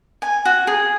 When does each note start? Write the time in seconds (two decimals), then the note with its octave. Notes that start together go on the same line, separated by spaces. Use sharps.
0.22 G#5
0.45 F#4
0.67 G#4